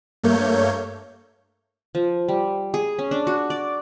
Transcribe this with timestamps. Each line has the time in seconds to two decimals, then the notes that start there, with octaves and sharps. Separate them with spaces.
0.23 G2 A3 A#3 C#5 G6
1.95 F3
2.28 G3
2.74 G#4
2.99 C#4
3.11 D4
3.27 F#4
3.50 D5